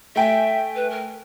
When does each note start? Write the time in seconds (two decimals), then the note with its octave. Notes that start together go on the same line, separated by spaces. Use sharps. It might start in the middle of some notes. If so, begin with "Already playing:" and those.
0.16 A3 E5 G5 G#5
0.75 B4
0.90 A#4